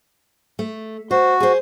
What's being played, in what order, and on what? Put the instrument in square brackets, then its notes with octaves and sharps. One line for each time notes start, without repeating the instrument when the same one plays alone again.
[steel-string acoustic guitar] A3
[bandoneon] F#4 [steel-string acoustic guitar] C5
[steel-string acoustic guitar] G#4 C5